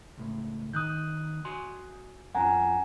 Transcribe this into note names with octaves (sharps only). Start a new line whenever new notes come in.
C#2 A2
D#3 D#6 F#6 G6
F#4 G#5 C6
F2 C#4 F4 F#5 G#5 A#5